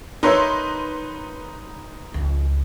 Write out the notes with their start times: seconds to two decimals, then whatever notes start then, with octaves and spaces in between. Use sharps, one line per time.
0.23 D#4 E4 A#4 B4 C#5 E5 C6
2.14 C#2 F3